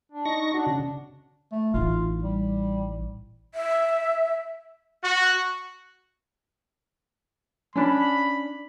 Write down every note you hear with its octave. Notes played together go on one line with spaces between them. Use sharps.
D4
D#4 C#6 A#6
D4 F#4
C#3
A3
A1 D#4 F4
G3
E5
F#4
C#4 D4 B5